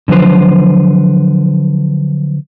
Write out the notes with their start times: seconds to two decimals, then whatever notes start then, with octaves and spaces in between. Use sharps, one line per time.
0.08 D3 F3 F#3 B4 C5